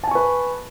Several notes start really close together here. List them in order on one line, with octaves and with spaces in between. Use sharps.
A5 G#5 C#6 B4